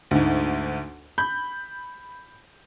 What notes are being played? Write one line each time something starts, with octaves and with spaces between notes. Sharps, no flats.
D2 G#2
B5 G6